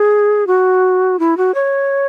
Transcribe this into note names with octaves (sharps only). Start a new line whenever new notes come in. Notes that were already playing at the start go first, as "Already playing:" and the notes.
Already playing: G#4
F#4
E4
F#4
C#5